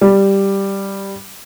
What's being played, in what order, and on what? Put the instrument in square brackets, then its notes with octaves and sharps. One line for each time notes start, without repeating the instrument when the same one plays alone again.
[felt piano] G3